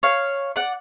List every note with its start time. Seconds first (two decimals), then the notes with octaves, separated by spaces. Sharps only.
0.03 C#5 F5
0.56 D5 F#5